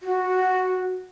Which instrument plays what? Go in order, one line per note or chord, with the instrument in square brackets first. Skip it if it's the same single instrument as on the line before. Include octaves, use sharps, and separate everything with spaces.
[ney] F#4